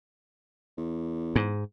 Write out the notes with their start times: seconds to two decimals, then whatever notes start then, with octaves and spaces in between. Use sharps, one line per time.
0.77 E2
1.36 G#2